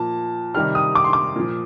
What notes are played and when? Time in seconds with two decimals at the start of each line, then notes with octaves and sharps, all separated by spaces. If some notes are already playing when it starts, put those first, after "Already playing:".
Already playing: A#2 F3 A5
0.54 C3 D#3 G3 F6
0.75 D#6
0.95 D6
1.04 C6
1.13 D6
1.36 A#2 F3